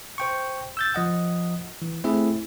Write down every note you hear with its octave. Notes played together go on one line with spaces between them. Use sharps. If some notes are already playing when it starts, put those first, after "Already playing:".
C5 G5 C#6
E6 G6 A6
F3 D#5 F#5
E3
A3 C4 E4 G#4 E5